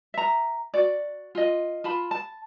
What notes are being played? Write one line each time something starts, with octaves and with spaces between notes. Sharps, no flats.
E5 A#5
F#4 D5
F4 D#5
F4 A5 B5
A5